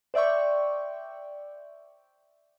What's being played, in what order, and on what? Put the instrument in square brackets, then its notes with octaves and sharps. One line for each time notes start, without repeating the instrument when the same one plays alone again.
[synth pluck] C5 D5 E5 G5 C#6